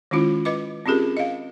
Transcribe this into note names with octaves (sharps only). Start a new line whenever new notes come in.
D#3 G#3 C#4 E4 F4
B4 D#5 D6
C4 C#4 F4 G4 G#4 A#4
D#5 F5